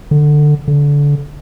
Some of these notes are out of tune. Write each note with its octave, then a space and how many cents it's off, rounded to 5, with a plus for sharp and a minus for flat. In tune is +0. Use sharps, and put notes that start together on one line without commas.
D3 +15
D3 -25